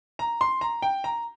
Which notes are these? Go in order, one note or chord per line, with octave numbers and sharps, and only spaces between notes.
A#5
C6
A#5
G5
A#5